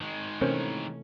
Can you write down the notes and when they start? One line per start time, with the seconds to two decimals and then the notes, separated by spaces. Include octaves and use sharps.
0.01 D#3 G#3
0.41 C3 E3 A3 C4 C#4 A#4 C5